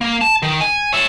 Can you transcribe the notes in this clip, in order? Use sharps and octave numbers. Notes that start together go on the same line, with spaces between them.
A#3
A5
D#3
G#5
C#5 E5